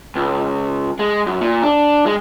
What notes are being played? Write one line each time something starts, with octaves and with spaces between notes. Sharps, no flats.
C#2
G#3
F#2
A#2
D4
G#3